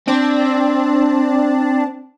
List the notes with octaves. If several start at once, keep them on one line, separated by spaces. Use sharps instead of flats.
C4 D4